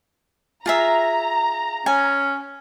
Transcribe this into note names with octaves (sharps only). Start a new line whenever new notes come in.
F4 G#4 E5 A#5
C#4 G#5